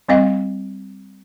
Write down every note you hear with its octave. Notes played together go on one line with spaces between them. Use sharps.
G3 C4 D#5 F5